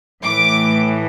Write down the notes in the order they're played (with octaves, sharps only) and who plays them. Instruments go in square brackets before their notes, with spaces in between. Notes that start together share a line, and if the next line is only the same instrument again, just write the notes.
[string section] A2 E3 D6